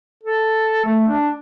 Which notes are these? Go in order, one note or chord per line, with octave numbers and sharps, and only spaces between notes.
A4
A3
D4